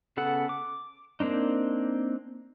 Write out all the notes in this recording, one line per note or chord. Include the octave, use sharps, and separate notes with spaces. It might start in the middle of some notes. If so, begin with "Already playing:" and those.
C#3 B3 A4 F#5
D6
A#3 C4 D4 D#4